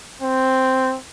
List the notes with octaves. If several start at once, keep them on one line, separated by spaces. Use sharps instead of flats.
C4